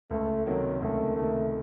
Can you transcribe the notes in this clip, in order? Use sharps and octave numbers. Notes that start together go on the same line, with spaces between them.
C#2 A3
C3 D#3 F#3 A#3
C#2 A3
C3 D#3 A3 A#3